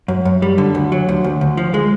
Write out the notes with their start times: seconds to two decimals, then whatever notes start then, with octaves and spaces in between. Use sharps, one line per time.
0.08 F#2
0.25 F#2
0.42 G3
0.58 D3
0.75 D2
0.92 F#3
1.09 D2
1.24 D2
1.41 D2
1.57 F3
1.74 G#3